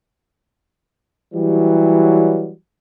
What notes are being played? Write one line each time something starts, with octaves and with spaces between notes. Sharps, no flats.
E3 F#3 G3